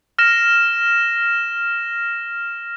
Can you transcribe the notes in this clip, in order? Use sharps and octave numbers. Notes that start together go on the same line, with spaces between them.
F6 A#6 E7